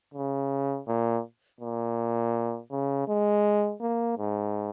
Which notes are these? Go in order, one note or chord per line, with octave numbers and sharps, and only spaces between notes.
C#3
A#2
A#2
C#3
G#3
A#3
G#2